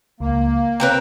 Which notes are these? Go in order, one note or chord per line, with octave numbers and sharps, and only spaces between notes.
C#2 A#3
C4 A#4 B4 C#5 A#5